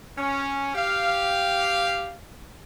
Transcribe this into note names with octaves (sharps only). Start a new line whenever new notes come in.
C#4
G4 F5